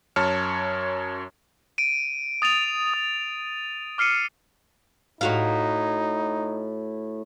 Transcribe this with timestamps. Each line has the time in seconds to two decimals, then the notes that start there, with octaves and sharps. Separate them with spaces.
0.16 F#2 C#5 A5 F6 C#7
1.78 D7 D#7
2.42 D#6 A6 D#7 F7
2.94 D#6
3.98 D6 F6 C7 C#7 D#7
5.21 A2 D#4 F#4 F5